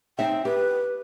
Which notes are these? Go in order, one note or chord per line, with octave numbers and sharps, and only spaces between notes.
C4 D#4 E5 G5
G4 B4